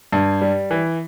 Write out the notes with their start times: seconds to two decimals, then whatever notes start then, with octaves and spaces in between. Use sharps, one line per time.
0.13 G2
0.41 G3
0.71 E3